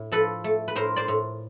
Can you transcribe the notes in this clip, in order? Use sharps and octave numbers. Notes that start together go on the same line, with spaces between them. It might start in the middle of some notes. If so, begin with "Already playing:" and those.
Already playing: A2
F3 A4 B4
A3
B4
A2 A#4 C5
C5 D5
A2